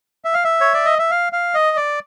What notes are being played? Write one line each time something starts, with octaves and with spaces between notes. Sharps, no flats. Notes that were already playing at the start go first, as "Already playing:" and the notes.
E5
F5
E5
C#5
D5
D#5
E5
F5
F5
D#5
D5